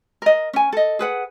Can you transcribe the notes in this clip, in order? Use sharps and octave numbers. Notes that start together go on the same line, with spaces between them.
A#4 D#5
C#4 G#5
A4 D#5
G#4 B4 F#5